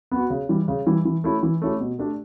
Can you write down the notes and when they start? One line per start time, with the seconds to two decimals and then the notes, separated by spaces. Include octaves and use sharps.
0.11 B3 F#4
0.30 C#3
0.49 E3 G3
0.68 C#3
0.87 E3 G3
1.05 E3
1.24 A3 C#4 E4 G4
1.43 E3
1.62 A3 C#4 E4 G4
1.80 B2
1.99 A3 D4 G4